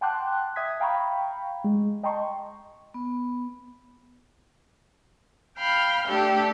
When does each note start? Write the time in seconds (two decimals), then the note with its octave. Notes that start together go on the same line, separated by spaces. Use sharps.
0.01 F#5 G5 A5 C6 D6 F#6
0.56 E5 D#6 G#6 B6
0.80 F5 G5 A#5 B5 C#6
1.64 G#3
2.03 D#5 G5 A5 A#5 C6 C#6
2.94 B3
5.58 F5 G5 B5 F6
6.07 A3 D4 G4 A4